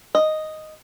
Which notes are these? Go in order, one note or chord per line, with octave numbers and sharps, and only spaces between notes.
D#5